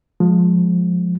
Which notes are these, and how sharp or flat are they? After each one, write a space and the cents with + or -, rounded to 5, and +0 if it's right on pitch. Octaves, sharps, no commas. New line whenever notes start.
F3 +25 G#3 +15